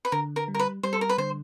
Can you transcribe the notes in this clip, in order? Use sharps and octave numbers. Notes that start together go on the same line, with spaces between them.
B4
D3 A#4
A#4
G3
A#4
B4
G3 C5
A4
A#4
B4
D3 C5